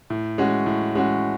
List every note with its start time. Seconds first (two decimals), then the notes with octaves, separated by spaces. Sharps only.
0.10 A2
0.38 G#3 C#4 F#4
0.66 A2
0.95 G#3 C#4 F#4